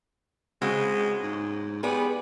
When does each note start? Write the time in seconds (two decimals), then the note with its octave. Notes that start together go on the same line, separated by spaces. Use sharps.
0.62 C#3 G#3 C4 F#4
1.23 G#2
1.83 B3 G4 G#4 D5